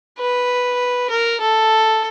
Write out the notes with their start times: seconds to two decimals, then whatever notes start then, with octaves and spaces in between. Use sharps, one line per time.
0.18 B4
1.10 A#4
1.40 A4